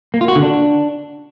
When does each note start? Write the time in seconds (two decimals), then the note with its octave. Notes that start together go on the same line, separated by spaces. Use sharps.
0.14 A#3
0.21 F4
0.28 F#4
0.36 D3
0.43 D4